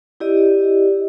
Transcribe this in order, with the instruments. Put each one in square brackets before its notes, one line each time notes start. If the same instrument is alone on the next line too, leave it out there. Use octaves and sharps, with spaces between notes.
[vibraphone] E4 G4 D5 D#5